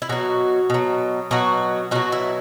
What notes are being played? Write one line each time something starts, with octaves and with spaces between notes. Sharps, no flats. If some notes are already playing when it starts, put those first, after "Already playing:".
E4
B2 F#3 F#4
B2 F#3
B2 F#3 F#4
B2 F#3 F#4
E4